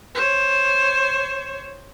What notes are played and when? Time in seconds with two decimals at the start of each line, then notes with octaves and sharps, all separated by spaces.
0.15 C5 C#5